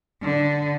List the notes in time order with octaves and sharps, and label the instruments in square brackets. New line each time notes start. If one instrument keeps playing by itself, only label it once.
[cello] D3